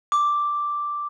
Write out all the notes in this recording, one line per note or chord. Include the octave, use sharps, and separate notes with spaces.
D6